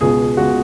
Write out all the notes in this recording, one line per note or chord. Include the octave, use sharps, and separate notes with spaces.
C#2 B2 G#3 G#4
C#2 B2 G#3 F#4